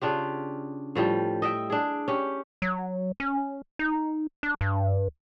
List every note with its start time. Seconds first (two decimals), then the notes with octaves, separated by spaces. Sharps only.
0.01 C#3 D4 F4 G4
0.95 A2 F3 G3
1.42 D#5 E5 G5
1.70 D4 G#4
2.08 C#4 G4
2.62 F#3
3.20 C#4
3.79 D#4
4.43 D4
4.61 G2